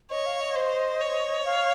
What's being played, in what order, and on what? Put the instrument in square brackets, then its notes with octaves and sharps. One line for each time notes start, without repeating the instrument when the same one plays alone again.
[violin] C#5 [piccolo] D#5
[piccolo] F5
D#5
[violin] C5
C#5
[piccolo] F5